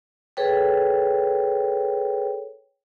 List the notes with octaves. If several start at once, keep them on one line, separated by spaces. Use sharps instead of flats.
G#4 A4 B4 C#5 G5